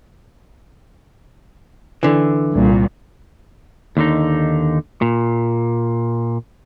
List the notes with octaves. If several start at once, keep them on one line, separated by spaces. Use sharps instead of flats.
D3 E3
C2 A#2
D#2 D3 D#4
A#2